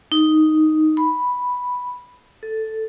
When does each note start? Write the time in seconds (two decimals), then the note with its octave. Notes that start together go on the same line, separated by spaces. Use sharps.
0.12 D#4
0.97 B5
2.43 A4